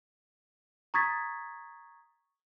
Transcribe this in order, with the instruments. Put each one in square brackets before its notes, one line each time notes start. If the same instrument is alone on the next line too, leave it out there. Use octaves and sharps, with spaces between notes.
[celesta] A#5 C#6 D#6 G#6 A6 B6